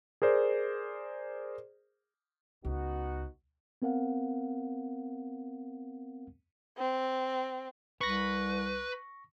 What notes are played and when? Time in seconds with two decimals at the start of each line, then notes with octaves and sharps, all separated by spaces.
0.22 G#4 A#4 C5 D5
2.65 C#2 B3 D#4 F#4
3.82 B3 C4 A#4 F5 F#5
6.78 C4
8.01 C2 B4 C#6 A#6